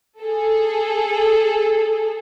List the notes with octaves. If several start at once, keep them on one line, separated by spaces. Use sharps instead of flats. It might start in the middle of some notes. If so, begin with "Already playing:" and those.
G#4 A4